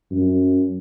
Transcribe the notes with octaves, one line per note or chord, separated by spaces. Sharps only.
F#2